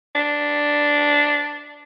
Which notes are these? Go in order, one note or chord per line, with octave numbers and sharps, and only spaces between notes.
D4